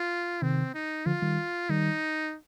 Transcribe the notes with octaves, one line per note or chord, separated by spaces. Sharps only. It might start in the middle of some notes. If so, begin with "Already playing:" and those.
Already playing: F4
C3 D#3 C4
D#4
D3 F3 F4
D#3 G3
D#3 G3 D#4